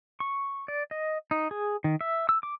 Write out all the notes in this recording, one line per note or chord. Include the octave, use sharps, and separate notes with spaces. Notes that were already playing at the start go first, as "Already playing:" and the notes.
C#6
D5
D#5
D#4
G#4
D#3
E5
E6
D6